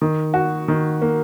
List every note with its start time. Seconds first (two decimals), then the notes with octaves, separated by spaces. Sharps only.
0.01 D#3
0.34 F#4
0.68 D#3
1.02 A#3